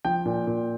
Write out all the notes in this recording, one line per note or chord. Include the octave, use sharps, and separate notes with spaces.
F3 G5
A#2
A#2